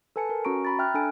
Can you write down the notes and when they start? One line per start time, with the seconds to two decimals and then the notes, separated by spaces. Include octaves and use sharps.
0.16 A4 B4 G#5 A5 C#7
0.29 A#4
0.45 C#4 F#4 A#5 C#6 D7
0.65 A#5 B5 A6
0.78 E5 G5 F6 F#6
0.94 D4 A4 G#5 F6 D7